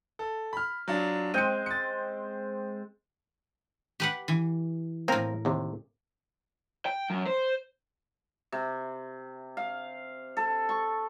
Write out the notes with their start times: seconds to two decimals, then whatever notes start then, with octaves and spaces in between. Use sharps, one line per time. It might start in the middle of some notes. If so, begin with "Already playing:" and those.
0.19 A4
0.53 B5 F6
0.88 F#3 D4 F4
1.34 G#3 C4 G5 C#7 D#7
1.66 A6 C#7
4.00 G4 B4 F#5
4.28 E3
5.08 A2 A#3 C4 A#4
5.45 D#2 C3
6.86 G5
7.10 F#2
7.26 C5
8.52 C3
9.57 F5
10.37 A4
10.69 C#6